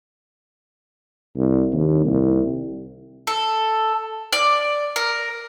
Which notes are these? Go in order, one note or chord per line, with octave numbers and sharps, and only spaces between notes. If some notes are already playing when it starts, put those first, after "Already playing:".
C2
D#2
C2
A4
D5
A#4